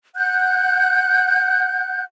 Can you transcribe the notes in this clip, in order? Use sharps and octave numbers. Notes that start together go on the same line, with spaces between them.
F#5 F#6 G6